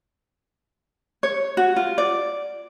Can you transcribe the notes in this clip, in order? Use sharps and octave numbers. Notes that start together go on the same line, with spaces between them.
C#5
F#4
F4
D5